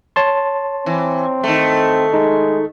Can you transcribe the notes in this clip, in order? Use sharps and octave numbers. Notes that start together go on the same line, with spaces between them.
C#5 A5 C6
E3 C4
D#3 A3
G#3 D#4